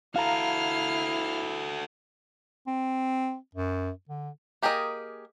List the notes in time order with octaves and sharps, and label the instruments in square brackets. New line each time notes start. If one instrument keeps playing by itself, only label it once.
[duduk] E4 [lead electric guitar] F#4 A4 [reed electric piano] F5 A#5 [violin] F6 C7
[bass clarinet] C4
F#2
D3
[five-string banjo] A#3 G4 G#4 A#4 D#5